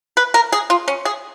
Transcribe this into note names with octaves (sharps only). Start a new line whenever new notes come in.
B4
A#4
G#4
F4
C#4
G#4